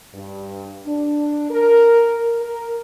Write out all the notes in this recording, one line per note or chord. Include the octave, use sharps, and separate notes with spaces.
G2
D4
A#4
A#4